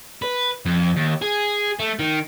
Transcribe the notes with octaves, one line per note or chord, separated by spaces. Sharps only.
B4
F2
D#2
G#4
A3
D#3